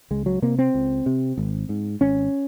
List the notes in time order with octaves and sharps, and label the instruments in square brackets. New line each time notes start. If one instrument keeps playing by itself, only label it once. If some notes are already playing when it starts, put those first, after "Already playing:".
[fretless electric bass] C#2 G#3
F#3
C3 A#3
C4
C#2
C3
G#1
G#2
G#1 C#4